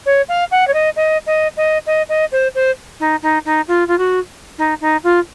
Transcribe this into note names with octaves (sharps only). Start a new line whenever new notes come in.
C#5
F5
F#5
C#5
D#5
D#5
D#5
D#5
D#5
D#5
C5
C5
D#4
D#4
D#4
F4
F4
F#4
D#4
D#4
F4